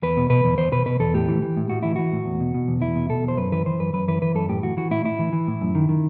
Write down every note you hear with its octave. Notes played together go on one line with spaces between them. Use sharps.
E2 B4
B2
B2 B4
E2
E2 C5
B2 B4
B2 B4
E2 A4
A2 G4
E3
E3
A2
A2 F#4
E3 E4
E3 F#4
A2
E2
B2
B2
E2
E2 E4
B2
B2 A4
E2
C5
F#2 B4
E3 B4
E3 C5
F#2 B4
F#2 B4
E3 B4
E3 B4
F#2 A4
A2 G4
E3 F#4
E3 F#4
A2 E4
A2 E4
E3
E3
A2
F#2
D#3
D#3